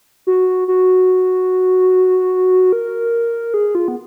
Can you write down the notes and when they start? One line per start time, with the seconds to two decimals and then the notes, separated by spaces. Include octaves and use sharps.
0.27 F#4
0.68 F#4
2.73 A#4
3.54 G#4
3.75 F4
3.88 B3